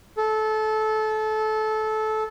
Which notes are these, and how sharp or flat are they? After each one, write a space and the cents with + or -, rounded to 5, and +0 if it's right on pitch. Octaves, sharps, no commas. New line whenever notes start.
A4 -20